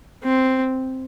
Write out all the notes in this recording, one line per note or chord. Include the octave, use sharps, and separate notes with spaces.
C4